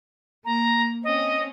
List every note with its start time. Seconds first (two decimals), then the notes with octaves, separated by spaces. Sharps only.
0.45 A#3 A#5
1.04 C4 C#4 D#5